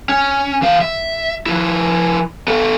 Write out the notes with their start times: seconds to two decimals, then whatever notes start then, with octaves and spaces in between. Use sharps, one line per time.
0.09 C#4
0.62 E3 F5
0.81 E5
1.46 F3 E4
2.48 B3 A4